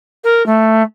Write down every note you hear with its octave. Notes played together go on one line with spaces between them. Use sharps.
A#4
A3